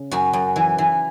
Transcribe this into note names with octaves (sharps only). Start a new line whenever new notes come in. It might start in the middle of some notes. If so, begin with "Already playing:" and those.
Already playing: C#3
F#2 F#4
F#2
E3
E3